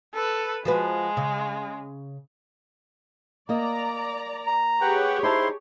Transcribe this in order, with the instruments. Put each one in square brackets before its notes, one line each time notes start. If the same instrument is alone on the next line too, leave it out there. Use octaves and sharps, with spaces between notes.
[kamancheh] A4 B4
[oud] F3 F#4 B4 [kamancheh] G#3
[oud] C#3
[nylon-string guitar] A#3 D#5 [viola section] D5 A#5
[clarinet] A#5
[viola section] G4 G#4 C#5 [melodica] B4 F#5 G5
[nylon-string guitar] D#4 A5 [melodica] E4 C6 [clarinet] C5